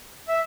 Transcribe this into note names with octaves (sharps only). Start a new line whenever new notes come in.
E5